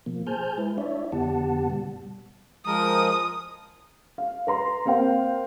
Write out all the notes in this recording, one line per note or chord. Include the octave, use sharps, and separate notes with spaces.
B2 F3 A#3
G#4 C5 G#5 A5 F6 G6
G#3 E4 B4
D4 E4 C#5 D5 E5
F2 D3 B3 G4 F#5 A5
B2 G3
F3 G#3 A#4 D#6
F5
B4 A#5 C6
A#3 C4 C5 F5 G5